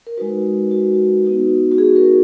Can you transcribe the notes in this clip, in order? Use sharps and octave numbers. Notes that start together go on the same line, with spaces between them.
A#4
G#3 D#4 F#4 B4
F#4
B3 D#4 F#4
F#4
G#4
A#4